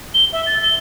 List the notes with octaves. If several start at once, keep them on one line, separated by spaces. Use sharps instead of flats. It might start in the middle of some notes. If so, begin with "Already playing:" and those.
G7
E5
A6
G7